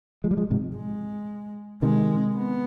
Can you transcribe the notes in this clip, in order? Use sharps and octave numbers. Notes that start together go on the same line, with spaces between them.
F3 G#3
G3
F3 G#3
G#2 C3
G#3
C3 D#3 G#3
B3